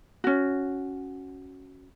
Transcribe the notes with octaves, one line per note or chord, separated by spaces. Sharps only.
C#4 F#4